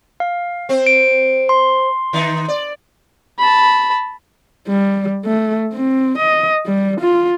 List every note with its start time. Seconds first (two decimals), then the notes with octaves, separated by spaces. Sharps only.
0.20 F5
0.69 C4 C5
0.87 D7
1.49 C6
2.13 D#3 D#4
2.48 D5
3.39 A5 B5
4.68 G3
5.25 A3
5.73 C4
6.19 D#5
6.66 G3
7.01 F4